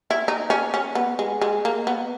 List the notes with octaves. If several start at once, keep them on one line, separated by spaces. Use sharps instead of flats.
E4
D#4
C#4
C#4
B3
G#3
G#3
A#3
B3